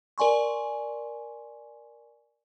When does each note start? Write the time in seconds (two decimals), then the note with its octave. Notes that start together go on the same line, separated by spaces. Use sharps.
0.18 A#4 D5 G#5 C6 C#6